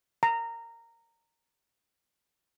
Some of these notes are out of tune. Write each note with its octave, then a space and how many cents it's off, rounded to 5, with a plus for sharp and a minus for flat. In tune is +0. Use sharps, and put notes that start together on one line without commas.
A#5 -15